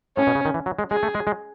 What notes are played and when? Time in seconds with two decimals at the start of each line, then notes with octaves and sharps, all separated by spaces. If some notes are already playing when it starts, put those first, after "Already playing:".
0.17 A2 C#4
0.27 B2
0.35 C#3
0.45 D#3
0.54 E3
0.66 F#3
0.79 G#3
0.91 G#3 G#4
1.03 A3
1.15 G#3
1.27 G#3